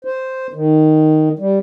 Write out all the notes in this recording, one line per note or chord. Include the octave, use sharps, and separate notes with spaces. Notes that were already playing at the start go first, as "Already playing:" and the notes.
C5
D#3
G3